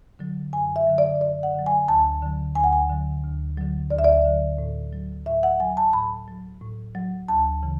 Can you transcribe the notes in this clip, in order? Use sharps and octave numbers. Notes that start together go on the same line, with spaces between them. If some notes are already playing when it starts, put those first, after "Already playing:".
D3 F#3
F#2 G#5
E5
D3 F#3
D5
F#2 D5
F#5
D3 F#3
G#5
D2 A5
D3 F#3
D2 G#5
F#5
G#5
D3 F#3
D2
D3 F#3
D2 D5
E5
D5
D3 F#3
A2
F#3
A2 E5
F#5
F#3 G#5
A5
A2 B5
F#3
A2
F#3
D2 A5
C#3 E3